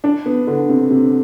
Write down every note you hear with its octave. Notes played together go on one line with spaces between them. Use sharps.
D4
B3
D3
C3
C3